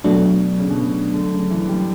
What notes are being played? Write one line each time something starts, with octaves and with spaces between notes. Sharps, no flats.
B2 F#3 A3 D4
C#3
B2
C#3
D3
C#3
E3
G3